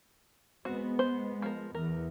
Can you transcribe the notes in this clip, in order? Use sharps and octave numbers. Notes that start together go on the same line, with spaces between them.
G#3 B3 C4 F#4
C5
F3 A#4
E2 A#4